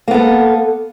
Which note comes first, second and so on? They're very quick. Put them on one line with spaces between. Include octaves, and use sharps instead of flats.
A#3 B3 A4